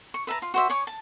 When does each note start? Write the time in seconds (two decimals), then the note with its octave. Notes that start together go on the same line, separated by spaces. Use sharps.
0.14 C#6
0.27 B4 E5 A5 A#5
0.42 F4
0.54 F#4 C5 E5
0.70 C#5 G#5 C#6 D6
0.87 A5